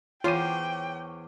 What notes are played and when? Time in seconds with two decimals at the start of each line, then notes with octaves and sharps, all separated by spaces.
0.24 E2 F4 C5 C#5 G5 D6 D#7